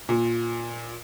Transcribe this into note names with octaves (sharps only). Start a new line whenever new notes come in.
A#2